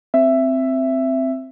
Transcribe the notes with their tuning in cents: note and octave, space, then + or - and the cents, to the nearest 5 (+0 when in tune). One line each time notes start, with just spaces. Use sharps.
C4 +0 E5 +10